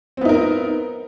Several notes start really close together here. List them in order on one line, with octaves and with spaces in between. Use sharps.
C4 B3 D#4 A#4